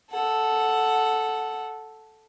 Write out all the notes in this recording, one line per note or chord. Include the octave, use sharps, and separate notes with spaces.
A4 F#5